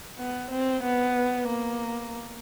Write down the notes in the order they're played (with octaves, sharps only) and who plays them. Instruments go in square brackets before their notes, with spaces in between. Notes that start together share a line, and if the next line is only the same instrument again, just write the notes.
[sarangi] B3
C4
B3
A#3